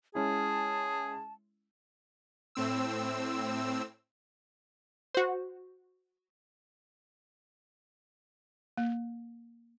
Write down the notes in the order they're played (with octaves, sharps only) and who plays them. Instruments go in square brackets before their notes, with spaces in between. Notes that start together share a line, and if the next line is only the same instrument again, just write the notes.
[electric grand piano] G#3 C#4 E4 [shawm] G#4 [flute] A5
[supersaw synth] A2 C4 E6
[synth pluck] F#4 C5
[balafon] A#3